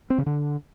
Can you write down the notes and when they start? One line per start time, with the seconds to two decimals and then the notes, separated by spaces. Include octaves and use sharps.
0.10 C4
0.18 C#3
0.26 D3